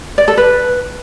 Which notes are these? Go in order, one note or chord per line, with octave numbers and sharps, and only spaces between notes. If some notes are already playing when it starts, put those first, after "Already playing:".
D5
A4
B4